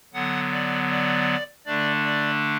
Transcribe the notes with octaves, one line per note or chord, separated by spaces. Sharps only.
D3 F#3 B3 F#5
D5
D5
D3 A3 D4 D5
D5